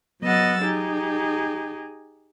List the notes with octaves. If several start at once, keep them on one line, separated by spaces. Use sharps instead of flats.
F#3 B3 D#5 F#5 E6 A6
D#4 G4 G#4